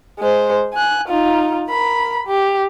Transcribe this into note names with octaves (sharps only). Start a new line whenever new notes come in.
G#3 C5
G#5 F#6
D#4 F4
A#4 B5
G4